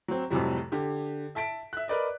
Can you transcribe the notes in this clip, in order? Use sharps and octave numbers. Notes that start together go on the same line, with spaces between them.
F#3 C4
F2 A2 C3 F#3 G3
D3 G4
E5 A5 B6 D7
E5 F#6
A#4 B4 D5 D#5